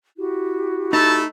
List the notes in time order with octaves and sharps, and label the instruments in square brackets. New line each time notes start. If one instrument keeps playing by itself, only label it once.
[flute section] E4 F#4 G4
[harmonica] A3 B5 E6 [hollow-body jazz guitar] D#4 [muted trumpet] A5